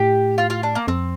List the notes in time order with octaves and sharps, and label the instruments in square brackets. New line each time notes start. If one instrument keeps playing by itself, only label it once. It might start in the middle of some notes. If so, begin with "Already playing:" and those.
Already playing: [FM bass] A2 [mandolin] G4
[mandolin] F4
F4
D4
A#3
[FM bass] F2 [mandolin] C4